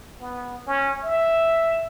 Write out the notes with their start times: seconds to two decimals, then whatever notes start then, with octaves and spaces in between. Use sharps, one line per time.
0.21 B3
0.67 C#4
1.04 E5